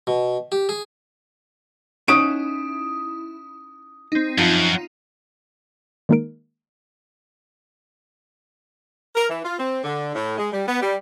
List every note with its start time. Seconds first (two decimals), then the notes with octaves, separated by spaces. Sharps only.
0.07 B2
0.52 G4
0.69 G#4
2.08 C#4 D#4 E4 F#5 D#6 D7
4.12 C4 D#4
4.38 F#2 F3 D#4 F4
6.09 D#3 G#3 A#3 D#4 A#4 D7
9.15 A#4
9.29 E3
9.43 F4
9.59 C4
9.84 D3
10.14 A2
10.38 G#3
10.52 G3
10.67 B3
10.81 G3